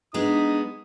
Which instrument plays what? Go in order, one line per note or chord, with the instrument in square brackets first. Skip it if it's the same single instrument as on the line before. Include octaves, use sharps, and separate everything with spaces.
[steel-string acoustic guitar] G#3 B3 G#4 [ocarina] D4 [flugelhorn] D#4 [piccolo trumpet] D#6